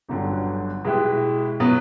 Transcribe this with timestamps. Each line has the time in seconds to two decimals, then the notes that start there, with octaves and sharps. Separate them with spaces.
0.08 G1 G2 D3 F#3
0.84 B2 G#3 B3 E4 G4
1.60 B2 F#3 B3